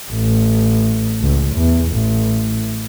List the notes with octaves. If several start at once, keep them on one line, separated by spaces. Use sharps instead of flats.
A1
C#2
E2
A1